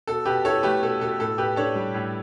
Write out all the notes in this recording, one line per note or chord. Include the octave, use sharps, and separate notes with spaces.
B2 A4
B2 G4 B4
E4 A4 C#5
A3 G4 B4
B2 A4
B2 A4
A2 A4
A2 G4 B4
D4 A4 C#5
G3
A2